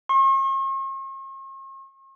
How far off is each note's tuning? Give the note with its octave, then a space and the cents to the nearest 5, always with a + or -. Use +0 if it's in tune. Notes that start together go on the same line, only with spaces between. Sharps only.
C#6 -45